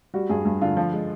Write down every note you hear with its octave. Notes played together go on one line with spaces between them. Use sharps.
G3 F#4
G2 G#4
G2
D3 F4
F3
G#3